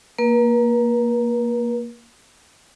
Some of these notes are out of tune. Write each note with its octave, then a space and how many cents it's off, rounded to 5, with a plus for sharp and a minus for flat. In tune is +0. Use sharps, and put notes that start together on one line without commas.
A#3 +0 B4 -45